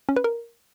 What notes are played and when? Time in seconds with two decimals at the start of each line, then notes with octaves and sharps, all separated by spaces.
0.09 C#4
0.16 B4
0.24 A#4